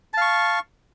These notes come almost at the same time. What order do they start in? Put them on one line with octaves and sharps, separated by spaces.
A5 F5 C#6